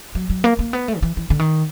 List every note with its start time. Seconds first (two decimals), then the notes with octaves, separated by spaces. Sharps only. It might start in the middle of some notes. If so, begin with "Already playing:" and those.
0.15 F#3
0.30 F#3
0.44 A#3
0.59 A#3
0.73 B3
0.88 A3
0.97 D#3
1.02 E3
1.17 E3
1.30 D3
1.39 D#3